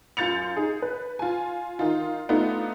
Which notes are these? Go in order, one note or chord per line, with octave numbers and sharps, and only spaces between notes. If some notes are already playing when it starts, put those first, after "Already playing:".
F#2 F4 G6 A6 C#7 F7
D#4 G#4
B4
F4 G#5
D#3 D#4 F4
A3 B3 D4 D#4 F4